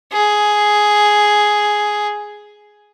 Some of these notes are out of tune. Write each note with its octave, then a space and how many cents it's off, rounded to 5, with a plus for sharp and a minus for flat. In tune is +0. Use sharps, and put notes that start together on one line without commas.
G#4 +5